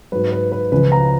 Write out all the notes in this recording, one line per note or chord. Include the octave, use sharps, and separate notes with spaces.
G#2 F#3 B4
B4
B4
C#2 C#3 F3 B4
A#5